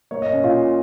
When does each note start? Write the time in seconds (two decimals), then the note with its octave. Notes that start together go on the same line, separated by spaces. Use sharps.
0.11 A#3 C#5
0.22 D#5
0.33 C#4 C#5
0.43 A#2 F4 F5